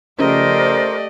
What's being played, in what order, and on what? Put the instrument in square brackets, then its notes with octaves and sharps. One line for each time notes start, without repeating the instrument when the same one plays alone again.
[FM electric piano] C#3 F3 [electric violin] A3 D#5 [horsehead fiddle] G4 D5 [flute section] A#4 C5